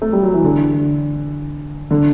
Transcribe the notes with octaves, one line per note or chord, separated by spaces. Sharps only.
A3
G3
F#3
E3
D3
D3